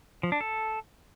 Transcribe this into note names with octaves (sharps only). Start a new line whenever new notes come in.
F3
D4
A4